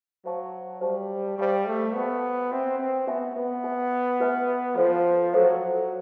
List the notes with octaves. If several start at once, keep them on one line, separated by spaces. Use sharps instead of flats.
F#3 C5 F5 A5 C#6
G3 C5 F5 A5 C#6
G3 C5 F5 A5 C#6
A3
B3 C5 F5 A5 C#6
C4 G4 B4 E5 G#5
C4
B3 G4 B4 E5 G#5
B3
G4 B4 E5 G#5
G4 B4 E5 G#5
F3 A4 C5 F5
F#3 A4 C5 F5